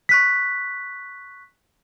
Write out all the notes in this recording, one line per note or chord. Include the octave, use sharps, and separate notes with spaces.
C#6 F#6 B6